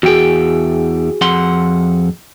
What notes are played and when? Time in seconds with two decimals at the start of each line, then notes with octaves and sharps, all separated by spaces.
0.03 E2 F#4 G#4 G5
1.21 F2 F#5 C6